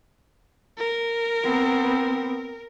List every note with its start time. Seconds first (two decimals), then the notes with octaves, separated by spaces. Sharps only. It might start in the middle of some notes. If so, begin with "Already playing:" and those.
0.78 A#4
1.44 B3 C4